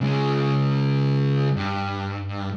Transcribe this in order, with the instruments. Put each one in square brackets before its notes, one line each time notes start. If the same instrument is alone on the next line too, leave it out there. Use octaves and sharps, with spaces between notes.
[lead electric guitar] C#3 G#3
G2